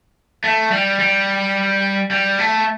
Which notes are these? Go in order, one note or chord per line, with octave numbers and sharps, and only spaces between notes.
A3
G3
G3
G3
A3